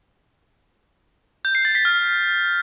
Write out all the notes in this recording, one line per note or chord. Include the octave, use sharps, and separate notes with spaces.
G6
C7
A6
B6
F6